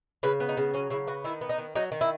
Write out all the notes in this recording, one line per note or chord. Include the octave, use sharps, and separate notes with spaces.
C#3 B4
B3
D#4
C#3
F#3 C#4
C#3 E4
B3 F#4
D#3 E4
B3
D#4
D#3
F#3 D#4
D#3
E4